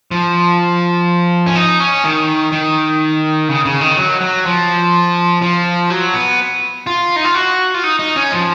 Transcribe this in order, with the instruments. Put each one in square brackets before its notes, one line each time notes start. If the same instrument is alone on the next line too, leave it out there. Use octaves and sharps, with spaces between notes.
[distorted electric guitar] F3
C#4
D#4
C#4
D#3
D#3
C#3
C#3
D#3
F#3
F#3
F3
F3
F#3
B3
F4
D#4
F4
F#4
F4
D#4
D#4
C#4
F3